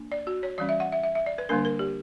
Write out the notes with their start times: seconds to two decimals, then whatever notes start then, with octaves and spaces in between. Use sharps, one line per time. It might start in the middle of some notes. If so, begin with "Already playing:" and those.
Already playing: A#3 D4
0.12 D5
0.27 F#4
0.43 C#5
0.58 E3 G3 C#4 D5
0.69 E5
0.80 F#5
0.92 E5
1.03 E5
1.15 E5
1.26 D5
1.38 B4
1.49 D3 G3 A#3 D4 A#4
1.65 A#4
1.79 G4